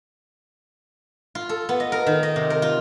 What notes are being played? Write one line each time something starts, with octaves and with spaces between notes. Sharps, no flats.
F4
A4
B3
D#5
A#4
D#3
D#5
C3
A#4
F4